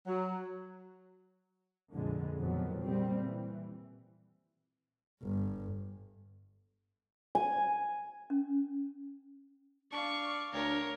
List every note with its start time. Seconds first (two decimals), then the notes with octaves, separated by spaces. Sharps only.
0.06 F#3
1.92 A#1 F2 D3 G#3
2.38 F2 A#2 D#3 F#3 B3
2.81 A#2 C#3 G3 C4
3.22 E3
5.22 G1
7.35 G#5
8.30 C#4
9.92 D4 D5 F5 C#6
10.53 D2 D4 A#4 C#5